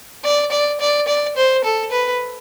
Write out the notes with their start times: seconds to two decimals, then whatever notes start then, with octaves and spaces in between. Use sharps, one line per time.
0.25 D5
0.51 D5
0.80 D5
1.07 D5
1.37 C5
1.64 A4
1.91 B4